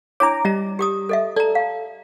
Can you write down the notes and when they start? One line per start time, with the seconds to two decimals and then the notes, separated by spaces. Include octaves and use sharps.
0.20 D4 E4 C#5 A#5 D6
0.45 G3 D#5 A#5
0.79 G4 D6 D#6
1.09 A4 D#5 E5
1.36 A4 D5 A#5
1.55 F5